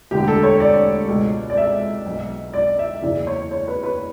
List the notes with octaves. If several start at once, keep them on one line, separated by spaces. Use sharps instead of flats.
E1 D2 D3 G4
A4
C#5
D5
C#2 B2
D5
E5
B1 B2
D5
E5
F#1 E2 C#3 E3 D5
C#5
C#5
B4
B4